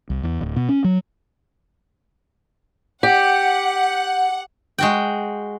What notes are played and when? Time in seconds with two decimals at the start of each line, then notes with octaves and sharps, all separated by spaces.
0.10 C2
0.23 E2
0.41 D1
0.56 B2
0.69 C#4
0.84 F#3
3.03 G4 F#5
4.78 G#3 F#4 G5